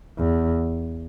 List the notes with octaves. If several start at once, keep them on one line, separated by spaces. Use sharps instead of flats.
E2